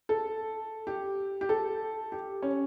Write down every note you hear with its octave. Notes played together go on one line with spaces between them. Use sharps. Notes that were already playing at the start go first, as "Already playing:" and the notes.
A4
G4
G4
A4
G4
C#4